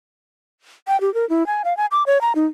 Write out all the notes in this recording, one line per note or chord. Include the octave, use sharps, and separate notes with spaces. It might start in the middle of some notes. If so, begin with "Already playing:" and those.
G5
G4
A#4
E4
G#5
F5
G#5
D6
C#5
A#5
D#4